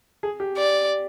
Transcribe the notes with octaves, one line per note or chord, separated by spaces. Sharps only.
G#4
G4
D5